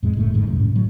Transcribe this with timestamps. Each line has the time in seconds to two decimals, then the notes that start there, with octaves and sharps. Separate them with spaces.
0.03 F2 A2 G#3
0.17 F#1 C#3 A3
0.34 G1 G#2 D#3
0.47 C2 F#2
0.60 A2 C#4
0.76 F#3 A3